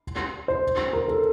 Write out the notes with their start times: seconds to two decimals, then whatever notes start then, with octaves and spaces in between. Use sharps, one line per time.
0.48 C5
0.93 A#4
1.08 A4